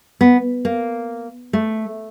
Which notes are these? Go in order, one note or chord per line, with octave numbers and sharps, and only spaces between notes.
B3
A#3
A3